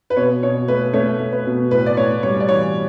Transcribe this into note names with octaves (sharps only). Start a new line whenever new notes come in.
B4
B2 C#5
B2 C#5
A3 B4
A3 C#5
A3
B4
B2
A2 B4
D5
A2 C#5
G3 C#5
D5
E3 C#5